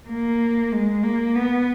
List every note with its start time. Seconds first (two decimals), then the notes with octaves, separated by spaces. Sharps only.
0.09 A#3
0.72 G#3
1.04 A#3
1.35 B3